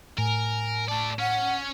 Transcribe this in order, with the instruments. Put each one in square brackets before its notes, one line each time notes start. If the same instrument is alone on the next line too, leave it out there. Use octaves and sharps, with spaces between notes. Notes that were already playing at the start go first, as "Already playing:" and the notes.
[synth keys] A2 [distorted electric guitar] A#4 [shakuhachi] G#5
[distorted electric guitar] A3 D5 [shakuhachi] A5
[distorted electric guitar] C#4 [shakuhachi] F#5